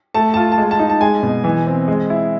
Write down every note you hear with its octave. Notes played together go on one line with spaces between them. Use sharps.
A3 A5
F4 A5
A5
G#3
A5
D#4
A5
G#3 G#5
B2
E3
C4
G#3
E4